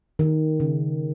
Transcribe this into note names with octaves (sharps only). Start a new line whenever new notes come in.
D#3
C#3